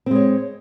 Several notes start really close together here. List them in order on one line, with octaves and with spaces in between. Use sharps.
C4 G#3 C#5